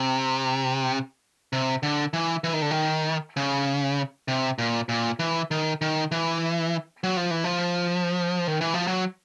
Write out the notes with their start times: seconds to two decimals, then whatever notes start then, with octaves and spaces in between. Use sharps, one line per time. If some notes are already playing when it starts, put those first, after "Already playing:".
Already playing: C3
1.53 C3
1.83 D3
2.13 E3
2.44 E3
2.54 D#3
2.62 D3
2.71 D#3
3.37 C#3
4.28 C3
4.59 A#2
4.89 A#2
5.19 E3
5.51 D#3
5.81 D#3
6.11 E3
7.04 F#3
7.17 F3
7.31 E3
7.44 F3
8.47 D#3
8.61 E3
8.74 F3
8.87 F#3